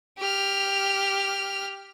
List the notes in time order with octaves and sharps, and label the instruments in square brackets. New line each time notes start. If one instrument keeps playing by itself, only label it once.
[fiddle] G4 F6